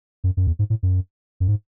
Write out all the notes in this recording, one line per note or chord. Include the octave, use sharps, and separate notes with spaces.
F#2
F#2
E2
G#2
A2
F#2
F#2
G#2